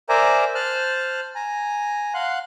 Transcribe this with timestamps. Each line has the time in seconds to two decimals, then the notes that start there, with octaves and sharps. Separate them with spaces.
0.09 A#4 C5 D5 E5 G#5 A#5
0.55 C5 A5 F6 F#6
1.35 G#5 A#5
2.14 F5 F#5 C6 F#6